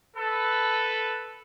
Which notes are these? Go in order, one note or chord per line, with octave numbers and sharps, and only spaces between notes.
A4 B4